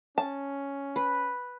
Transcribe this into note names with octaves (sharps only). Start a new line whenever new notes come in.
C#4 A5
B4